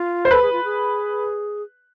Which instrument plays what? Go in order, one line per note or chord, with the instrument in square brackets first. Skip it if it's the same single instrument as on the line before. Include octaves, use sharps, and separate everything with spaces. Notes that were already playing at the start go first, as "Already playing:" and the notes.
Already playing: [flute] F4
[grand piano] C5
[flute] A4 [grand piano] B4
[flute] G#4
F4
G#4